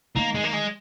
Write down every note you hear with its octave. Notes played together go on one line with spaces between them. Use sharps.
D#3 A#3
G#3
A#3
G#3